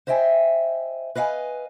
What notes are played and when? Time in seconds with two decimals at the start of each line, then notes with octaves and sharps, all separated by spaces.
0.07 C5 D#5 E5 G5 G#5
1.15 B4 D#5 F5 F#5 G#5